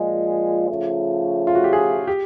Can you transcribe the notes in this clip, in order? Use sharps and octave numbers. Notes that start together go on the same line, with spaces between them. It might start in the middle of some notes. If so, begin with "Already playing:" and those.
Already playing: A#2 F3 G#3
C#3 F3 A3
F4
F#4
G4
G#4
G4